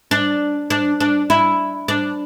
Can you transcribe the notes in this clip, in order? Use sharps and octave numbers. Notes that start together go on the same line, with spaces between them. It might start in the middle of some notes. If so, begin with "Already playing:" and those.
D4
D4
D4
E4
D4